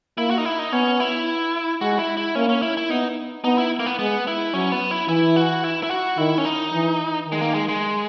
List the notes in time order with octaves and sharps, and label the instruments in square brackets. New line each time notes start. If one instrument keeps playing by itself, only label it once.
[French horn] A#3 [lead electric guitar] E4
[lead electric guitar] F#4
D#4
E4
D#4
[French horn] B3 [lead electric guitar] C#4
[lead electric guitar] E4
[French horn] G#3 [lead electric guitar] F#4
[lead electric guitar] E4
E4
[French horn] A#3 [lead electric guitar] C#4
[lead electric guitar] C#4
E4
E4
[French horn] B3 [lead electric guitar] D#4
[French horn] B3 [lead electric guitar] D#4
[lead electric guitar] E4
A#3
B3
[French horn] G#3 [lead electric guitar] B3
[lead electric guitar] E4
[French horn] F#3 [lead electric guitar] C#4
[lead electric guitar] B3
E4
[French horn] E3 [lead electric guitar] E4
[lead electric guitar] F#4
E4
E4
F#4
[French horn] D#3 [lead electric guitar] E4
[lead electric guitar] C#4
D#4
[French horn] E3
D#3
[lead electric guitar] G#3
A#3
G#3
G#3